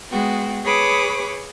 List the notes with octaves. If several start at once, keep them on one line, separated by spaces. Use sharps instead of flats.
G#3 B3 F#4 G5
G#4 B4 C#5 B5 D6 D#6